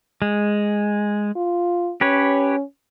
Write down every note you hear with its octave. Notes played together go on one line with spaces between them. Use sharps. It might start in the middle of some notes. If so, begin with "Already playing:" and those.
G#3
F4
C#4 G4 B4 C#5